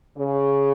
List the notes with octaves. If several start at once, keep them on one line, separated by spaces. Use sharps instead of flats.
C#3